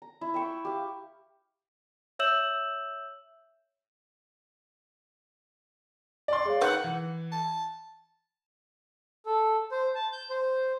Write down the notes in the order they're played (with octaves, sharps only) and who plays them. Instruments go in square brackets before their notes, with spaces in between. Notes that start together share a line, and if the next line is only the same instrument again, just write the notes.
[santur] A#5
E4
E5 G5 C#6
G4 F5
[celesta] C#5 E5 E6 G6 E7 F#7
[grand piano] D5 C6
[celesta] G#4 C#5 F5
[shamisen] D#3 B4 [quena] F#5 [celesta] G6
[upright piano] E3
[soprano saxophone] A5
[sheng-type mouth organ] A4
C5
A5
G6
C5